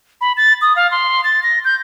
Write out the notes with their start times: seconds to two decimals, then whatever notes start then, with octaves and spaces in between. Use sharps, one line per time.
0.21 B5
0.37 A6
0.62 D#6
0.76 F5
0.91 C6
1.24 A6
1.43 A#6
1.65 G6